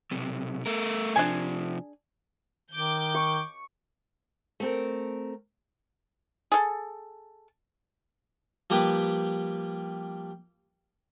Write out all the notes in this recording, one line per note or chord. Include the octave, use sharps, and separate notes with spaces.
B1 C3
A3 A#4
C3 F3 D4 G#4 G#5
D#3 D6 G6
C#6
A3 C4 A#4
G#4 A4
F3 G3 A#3 G4 B4